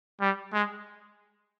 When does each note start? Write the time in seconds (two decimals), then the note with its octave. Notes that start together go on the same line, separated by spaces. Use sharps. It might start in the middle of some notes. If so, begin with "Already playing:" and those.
0.21 G3
0.53 G#3